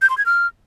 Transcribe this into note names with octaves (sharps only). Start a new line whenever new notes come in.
G6
C6
G#6
F6